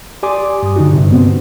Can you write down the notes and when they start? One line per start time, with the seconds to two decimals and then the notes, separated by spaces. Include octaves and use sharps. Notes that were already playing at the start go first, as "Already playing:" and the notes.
0.23 G4 D5 G#5 C6 D6 D#6
0.63 G2 D#6
0.76 D3 D#4 F#4
0.93 G2 C3
1.12 B3 C4